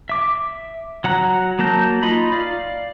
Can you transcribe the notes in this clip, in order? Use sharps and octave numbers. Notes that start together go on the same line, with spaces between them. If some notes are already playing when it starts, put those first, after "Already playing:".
E5 D6
F#3 F#5 A#5 F#6
F#3 A#3 A5 A#5 G6
D#4 F4 D#5 B5
D5 F5